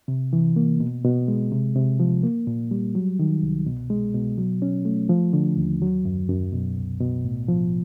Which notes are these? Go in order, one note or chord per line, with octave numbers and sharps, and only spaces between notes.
C3
E3
A#3
B2
B2
G#3
C3
C3
F3
A#3
A#2
G3
F#3
D#3
C2
B2
G#3
B2
F#3
C#4
A3
F3
D3
D#2
F#3
F#2
F#2
B2
C2
B2
A2
F3